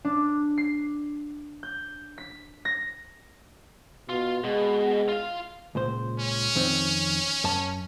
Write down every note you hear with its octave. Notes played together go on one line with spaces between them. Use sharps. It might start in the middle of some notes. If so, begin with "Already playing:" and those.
D4
C7
G6
B6
A#6
B2 F4
B2 G#3
F4 F5
C#2 A#2 C5
C#4
F2 D#3 C4
F#2 A5